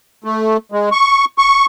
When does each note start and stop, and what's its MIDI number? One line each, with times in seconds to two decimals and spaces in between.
0.24 0.57 57
0.72 0.89 56
0.92 1.25 85
1.38 1.66 85